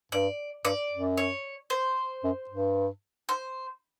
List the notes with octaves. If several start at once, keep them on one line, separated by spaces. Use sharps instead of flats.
G2 D5
G2 D5
F#2
C#5
C5
F#2
G2
C5